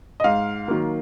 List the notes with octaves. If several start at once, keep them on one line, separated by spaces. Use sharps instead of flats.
D#5
G#2 F5
D#3 F#3 A#3